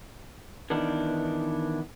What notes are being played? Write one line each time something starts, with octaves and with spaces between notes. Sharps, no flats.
D#3 E3 B3 D4